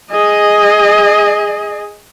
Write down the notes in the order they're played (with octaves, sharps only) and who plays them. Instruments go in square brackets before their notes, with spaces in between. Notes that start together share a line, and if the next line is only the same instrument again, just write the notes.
[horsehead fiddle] G#4 D#5